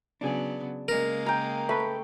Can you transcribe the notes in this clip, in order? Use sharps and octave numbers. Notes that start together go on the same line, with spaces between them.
C#3 F#3 B3 D4 G#4
C#3 G#3 A#3 A#4
G5 A#5
A3 B4 B5